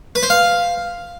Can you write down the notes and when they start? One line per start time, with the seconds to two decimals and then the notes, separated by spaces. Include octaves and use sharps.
0.15 B4
0.23 C5
0.30 F5